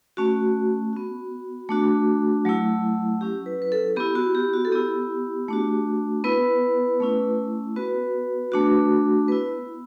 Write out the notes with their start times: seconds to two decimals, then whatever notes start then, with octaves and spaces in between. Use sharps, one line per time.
0.17 A3 C#4 F#4
0.93 B3 F#4
1.69 A3 D4 F#4
2.45 F#3 A3 E4
3.21 F#3 C#4 E4 G4
3.46 B4
3.62 B4
3.72 A4
3.96 B3 E4 G4
4.15 F#4
4.35 G4
4.53 F#4
4.65 A4
4.72 B3 E4 G4
5.49 A3 D4 F#4
6.24 B3 E4 B4
7.00 A3 C#4 E4
7.76 B3 F#4 B4
8.52 A3 D4 F#4
9.28 B3 E4 B4